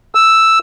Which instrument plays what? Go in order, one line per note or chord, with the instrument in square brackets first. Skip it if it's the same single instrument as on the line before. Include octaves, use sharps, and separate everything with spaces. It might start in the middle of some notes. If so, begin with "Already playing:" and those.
[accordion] E6